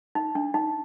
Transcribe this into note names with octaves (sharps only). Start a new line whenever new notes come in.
D#4
D4
D#4